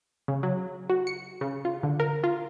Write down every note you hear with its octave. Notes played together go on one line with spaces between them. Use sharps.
C#3
F#3
F#4
C#7
C#3
F4
D3
A#4
F4